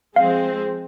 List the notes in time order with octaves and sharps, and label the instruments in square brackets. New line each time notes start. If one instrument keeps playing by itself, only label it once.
[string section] F3 G#3 C4 [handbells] F5